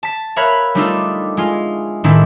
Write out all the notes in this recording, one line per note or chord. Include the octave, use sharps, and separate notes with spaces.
A5 B6
A#4 C#5 E5 F5 B5 F#6
G3 A3 D4 D#4 F4 A4
G#3 F4
A2 D#3 G#3 C4 D4 E4